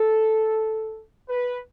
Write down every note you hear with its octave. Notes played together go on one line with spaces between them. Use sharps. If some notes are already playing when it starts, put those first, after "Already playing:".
Already playing: A4
B4